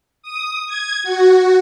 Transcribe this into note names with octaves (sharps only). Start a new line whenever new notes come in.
D#6
G#6
F#4